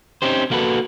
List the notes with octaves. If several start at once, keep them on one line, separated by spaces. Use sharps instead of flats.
C4 C#4 D#4 G4 C5
A#3 F#4 A4 B4